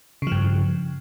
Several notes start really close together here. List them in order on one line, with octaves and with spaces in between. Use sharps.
C#3 F3 G2